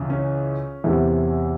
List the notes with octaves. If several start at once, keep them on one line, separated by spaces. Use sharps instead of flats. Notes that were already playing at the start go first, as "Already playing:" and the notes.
Already playing: C#2 C#3 E3
C#4
E2 C3 E3